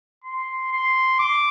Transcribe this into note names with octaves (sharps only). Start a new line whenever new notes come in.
C6
C6
D6